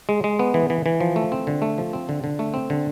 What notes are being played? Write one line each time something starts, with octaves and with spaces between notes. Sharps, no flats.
G#3
G#3
B3
E3
E3
E3
F3
A3
C4
D3
A3
F3
C4
D3
D3
A3
C4
D3